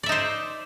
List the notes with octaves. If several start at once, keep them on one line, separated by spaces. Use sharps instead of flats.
D#4 C5 D5 E5